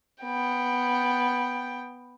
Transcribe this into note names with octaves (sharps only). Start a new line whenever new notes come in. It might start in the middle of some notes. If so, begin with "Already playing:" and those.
B3 G5